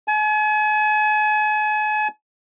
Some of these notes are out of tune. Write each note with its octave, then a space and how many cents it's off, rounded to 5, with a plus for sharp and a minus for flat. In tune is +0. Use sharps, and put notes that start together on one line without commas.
G#5 +40